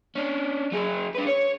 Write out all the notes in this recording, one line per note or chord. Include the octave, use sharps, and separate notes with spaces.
C#4 D4
F#3 G#4
D4 B4
C#5